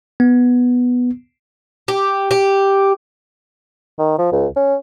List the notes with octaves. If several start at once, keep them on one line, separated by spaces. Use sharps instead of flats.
B3
G4
G4
D#3
F3
C#2
C#4